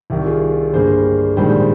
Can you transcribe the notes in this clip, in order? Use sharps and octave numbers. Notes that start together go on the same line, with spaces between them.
C2 C3 D#3
F4 G#4
G1 G2 G3 A#3 G#4 C5
A#1 G#2 D#3 G3 G#4 C5